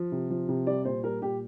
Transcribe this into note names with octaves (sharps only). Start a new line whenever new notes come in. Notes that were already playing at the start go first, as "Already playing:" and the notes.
Already playing: F3
C3
F3
C3
G3 D5
A#2 C5
G3 A#4
A#2 G4